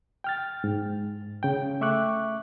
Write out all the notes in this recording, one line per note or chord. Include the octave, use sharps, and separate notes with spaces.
G5 F6 A6
G#2
C#3 G5
A3 E5 C#6 D6 F#6